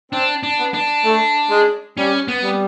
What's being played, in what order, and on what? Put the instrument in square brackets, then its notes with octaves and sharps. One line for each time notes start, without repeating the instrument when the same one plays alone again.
[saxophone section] C4 [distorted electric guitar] D4
[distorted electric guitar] D4
[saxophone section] B3
[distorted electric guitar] D4
[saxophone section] A3
G#3
[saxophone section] G3 [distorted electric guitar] C#4
[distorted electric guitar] B3
[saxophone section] G3